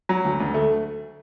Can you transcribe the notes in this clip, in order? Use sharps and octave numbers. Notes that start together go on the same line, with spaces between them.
F#3
D2
D2
A3